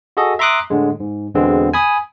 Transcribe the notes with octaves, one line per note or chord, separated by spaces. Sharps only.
F#4 G#4 A4 D#5
E5 A#5 C6 D6 D#6 F#6
A2 D3 G#3
G#2
E2 B2 D3 E3 G#3 C4
G#5 B5 D#6